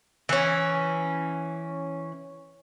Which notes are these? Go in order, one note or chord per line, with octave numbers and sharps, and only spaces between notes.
E3 C#4